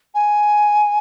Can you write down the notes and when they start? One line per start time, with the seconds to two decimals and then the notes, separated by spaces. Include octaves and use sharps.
0.14 G#5